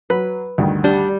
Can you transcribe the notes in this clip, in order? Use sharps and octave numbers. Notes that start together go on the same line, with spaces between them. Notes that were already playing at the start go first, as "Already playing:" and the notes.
F#3 B4
D2 G2 D#3
G3 D4